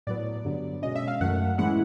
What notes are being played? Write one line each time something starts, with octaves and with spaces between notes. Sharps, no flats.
A2 F#3 B3 D5
G2 D3 F#3 B3
B2 G#3 C#4 D#5
E5
F5
F#2 D#3 F#3 A3 F#5
A2 E3 G#3 C#4 E4 F#5